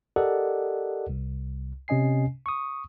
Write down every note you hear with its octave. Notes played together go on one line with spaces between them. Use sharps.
G4 A4 A#4 D5 D#5 F#5
C2
C3 C#4 D#5 G#5 C7
C#6 D#6